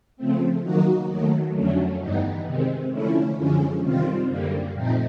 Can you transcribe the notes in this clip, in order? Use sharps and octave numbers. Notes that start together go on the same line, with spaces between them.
C#3 F3 A3 C4
D#3 F#3 A#3 D#4 F#4
D#2 D#3 F#3 A3
F2 D3 F#3 A3 C#4
G2 E3 G3 B3 D#4
C3 D#3 G#3 C4
D3 F3 A3 C#4 E4
F#2 D3 F3 G#3 C#4
C3 D#3 G3 C4 F4
F#2 D3 G3 A#3
A#2 F3 A3 C4 D#4